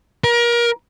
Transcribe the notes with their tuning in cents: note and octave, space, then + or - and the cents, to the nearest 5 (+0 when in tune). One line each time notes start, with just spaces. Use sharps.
A#4 +30